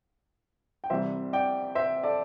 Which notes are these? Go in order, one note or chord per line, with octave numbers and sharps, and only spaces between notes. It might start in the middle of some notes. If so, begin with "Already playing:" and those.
G5
C2 C3 E3 G3 C5 E5
D5 G5
C5 E5
A4 D5